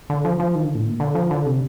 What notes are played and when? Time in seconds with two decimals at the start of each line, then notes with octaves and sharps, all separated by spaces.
0.10 D3
0.25 F3
0.40 F3
0.55 D#3
0.65 D3
0.75 A2
0.86 A#2
1.00 D3
1.15 F3
1.31 D3
1.46 C3